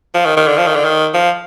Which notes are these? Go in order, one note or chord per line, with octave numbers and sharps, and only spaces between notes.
F3
D#3
D#3
D3
F3
D#3
D3
D#3
F3